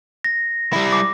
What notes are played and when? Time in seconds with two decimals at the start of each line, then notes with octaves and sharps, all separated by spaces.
0.24 A#6
0.73 G3 E4
0.93 D6